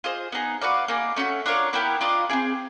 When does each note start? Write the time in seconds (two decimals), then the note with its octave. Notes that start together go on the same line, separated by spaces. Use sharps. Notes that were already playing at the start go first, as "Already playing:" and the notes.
0.04 F4 G#4 C5 D#5
0.32 B3 D#4 G#4
0.61 F#4 B4 D5 F5
0.88 A#3 D#4 G#4
1.16 A3 C#4 F#4
1.46 D4 F4 A#4 C#5
1.73 B3 E4 G4 A#4
2.01 D4 F4 A#4 D#5
2.29 C4 E4 G#4